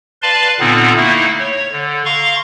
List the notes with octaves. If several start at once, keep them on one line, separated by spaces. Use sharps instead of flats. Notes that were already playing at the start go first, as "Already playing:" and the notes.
B4 D5 F5 A5 C6
A#2 D3 B3 C4 D#4
A3 A#3 D#4 E4
C#5
D3
F5 A#5 C6 C#6